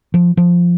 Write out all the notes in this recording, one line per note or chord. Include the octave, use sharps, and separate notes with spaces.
F3
F3